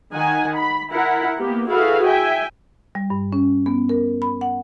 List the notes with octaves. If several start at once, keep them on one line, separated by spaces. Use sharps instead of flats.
D#3 F#5 G#5
B5
E4 A#4 F#5
A#3 B3 G4
E4 F#4 G#4 A4 B4 F5
E5 G5 G#5
G3
G2
C#4
B3
A#4
B5
F#5